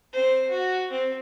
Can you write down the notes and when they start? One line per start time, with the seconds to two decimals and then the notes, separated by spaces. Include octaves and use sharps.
0.13 C4 C5
0.50 F#4
0.91 C4